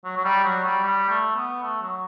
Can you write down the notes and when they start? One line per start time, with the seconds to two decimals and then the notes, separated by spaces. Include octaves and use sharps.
0.05 F#3
0.16 F#3
0.25 G3
0.44 F#3
0.64 G3
0.84 G3
1.09 A3
1.36 B3
1.62 A3
1.82 F#3